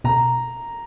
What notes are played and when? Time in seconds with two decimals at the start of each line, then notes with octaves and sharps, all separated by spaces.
0.04 B2 A#5